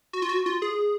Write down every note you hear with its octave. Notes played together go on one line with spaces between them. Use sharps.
F#4
F4
F#4
F4
G#4